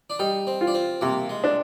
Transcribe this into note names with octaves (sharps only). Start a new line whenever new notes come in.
D4
G3 D#4
C4
F4
D4
C4
C3 A#3
G#3
D4